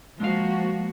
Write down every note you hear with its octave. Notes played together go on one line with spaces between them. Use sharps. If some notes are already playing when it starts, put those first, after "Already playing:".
F3 G#3 A#3 F#4 F5